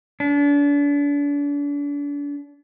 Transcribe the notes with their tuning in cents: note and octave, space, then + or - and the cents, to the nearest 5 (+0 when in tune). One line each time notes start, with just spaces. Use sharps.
D4 -35